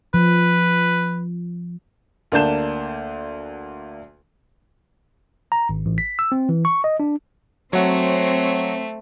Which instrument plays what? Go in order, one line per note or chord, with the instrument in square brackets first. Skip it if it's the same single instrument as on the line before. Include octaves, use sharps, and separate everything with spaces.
[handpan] F3 [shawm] B4
[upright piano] D2 A#3 D4 A5 G6 E7
[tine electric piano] A#5
G#1
A1
B6
E6
C4
E3
C#6
D#5
D4
[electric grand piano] F#3 F#5 [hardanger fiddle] A3 [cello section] C4 [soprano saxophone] C#5